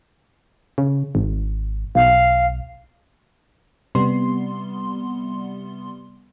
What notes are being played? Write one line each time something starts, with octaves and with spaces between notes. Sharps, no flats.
C#3
G#1
B1 F5
C3 G3 B3 C6